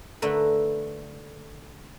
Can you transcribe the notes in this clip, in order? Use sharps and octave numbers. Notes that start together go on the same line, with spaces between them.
D3 A3 A#4 B4